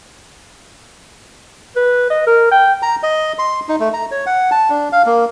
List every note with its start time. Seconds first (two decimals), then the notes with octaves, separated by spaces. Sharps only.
1.76 B4
2.10 D#5
2.27 A#4
2.51 G5
2.82 A#5
3.03 D#5
3.39 C6
3.69 D#4
3.80 A3
3.94 A#5
4.11 C#5
4.26 F#5
4.51 A5
4.70 D4
4.92 F5
5.06 A#3